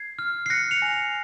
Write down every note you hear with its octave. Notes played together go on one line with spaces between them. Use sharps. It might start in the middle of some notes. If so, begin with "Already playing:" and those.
Already playing: G#6 C7
F6
C7
F#6 A#6 C#7
C#7 F7
G#5
C#7 F7